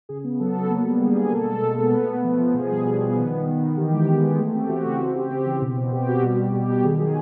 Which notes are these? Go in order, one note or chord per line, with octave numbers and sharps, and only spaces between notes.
C#3 G#4
B3
F#3 A4
B3
A#3
G3
D3 G#4
A#3 G#4
B2 A4
G#3
B2
B3
A3
A3
F3
F3
B2 G#4
G3
B2
B3
D#3
D#3
D#3
D#3
E3 G4
G#3
B3
G#3
A3 G#4
C4 G4
E3 F#4
C#3
C4 F#4
C4 G4
C4
E3
B2
C4
B2 G4
G3 F#4
B2
B2
B2 G4
B2
D#3 G#4
F#3 G#4